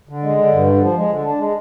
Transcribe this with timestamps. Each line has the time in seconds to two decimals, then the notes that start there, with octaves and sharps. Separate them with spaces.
0.09 D3
0.23 G#3
0.38 D3
0.52 G2
0.67 D3
0.81 F3
0.96 G#3
1.10 D3
1.25 D4
1.39 G#3